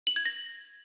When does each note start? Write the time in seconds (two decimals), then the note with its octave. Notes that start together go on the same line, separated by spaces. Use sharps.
0.07 F#7
0.16 G#6
0.25 A#6